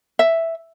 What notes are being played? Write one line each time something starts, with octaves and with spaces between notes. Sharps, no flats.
E5